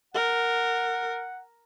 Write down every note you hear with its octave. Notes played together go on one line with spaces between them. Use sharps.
A#4 F#5